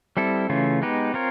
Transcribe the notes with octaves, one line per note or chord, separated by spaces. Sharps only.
G3 C4 E4 A4
C#3 E3 A3 C#4 F4
G#3 B3 D#4 G4 B4
C4 F4 A#4 C#5